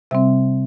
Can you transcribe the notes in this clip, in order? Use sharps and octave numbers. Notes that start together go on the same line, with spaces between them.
C3 G3 C4 E5